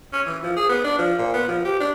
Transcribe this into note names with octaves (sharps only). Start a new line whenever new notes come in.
C#4
E3
F3
G#4
B3
D4
F3
A#2
B3
F3
G4
D4